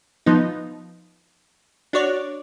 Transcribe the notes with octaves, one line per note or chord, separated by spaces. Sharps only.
F3 B3 D#4
D4 F#4 C#5 D5